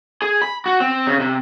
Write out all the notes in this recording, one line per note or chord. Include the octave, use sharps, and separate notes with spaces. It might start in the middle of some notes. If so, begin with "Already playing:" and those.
G#4
B5
F#4
C4
C#3
C3